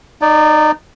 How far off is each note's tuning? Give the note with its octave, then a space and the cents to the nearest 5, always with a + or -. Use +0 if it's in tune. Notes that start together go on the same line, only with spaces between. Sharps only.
D#4 -25 D5 +0